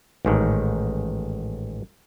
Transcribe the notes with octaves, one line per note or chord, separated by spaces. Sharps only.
A1 G#2 D#3